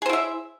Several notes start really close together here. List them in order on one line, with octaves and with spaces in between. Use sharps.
G#4 C5 E4 E5